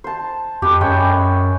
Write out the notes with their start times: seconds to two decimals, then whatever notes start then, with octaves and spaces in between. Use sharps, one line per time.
0.04 C5 A5
0.62 F2 G4 B4
0.81 F#2 G#3 C#5 G5